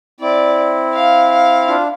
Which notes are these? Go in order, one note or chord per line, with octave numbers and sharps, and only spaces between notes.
C4 E4 D5
F5
F5
D4 F4